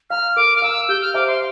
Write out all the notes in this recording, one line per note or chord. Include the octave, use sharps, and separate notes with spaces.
F5 A#5 F6
A#4 D6
F6
F5 A#5 E6
G4 G6
F6
C5 E5 A#5 D6
C6